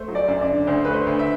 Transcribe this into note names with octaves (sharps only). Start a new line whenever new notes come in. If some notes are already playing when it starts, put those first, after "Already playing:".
Already playing: A3 C5
F#3
D5
F#2
D5
D3
D2 C5
A3 B4
C5
D2
E5